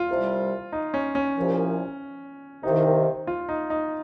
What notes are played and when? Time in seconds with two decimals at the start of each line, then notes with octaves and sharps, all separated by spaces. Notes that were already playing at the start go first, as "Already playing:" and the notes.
Already playing: F4
0.09 C2 C3 G3
0.72 D#4
0.94 C#4
1.15 C#4
1.36 C2 A#2 F3
2.63 C2 C3 D#3 A#3 D#4
3.27 F4
3.49 D#4
3.70 D#4